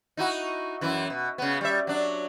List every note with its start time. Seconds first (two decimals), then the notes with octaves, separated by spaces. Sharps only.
0.17 D#4 E4 F#4
0.81 F#2 E3 E4
1.10 B2
1.38 C#3 B3
1.61 G3 E5
1.87 F#3 D4